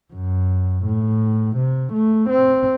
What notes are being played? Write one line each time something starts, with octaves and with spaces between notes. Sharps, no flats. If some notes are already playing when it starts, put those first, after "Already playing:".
F#2
A2
C3
A3
C4